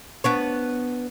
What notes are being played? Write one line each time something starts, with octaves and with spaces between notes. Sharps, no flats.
B3 D4 C#5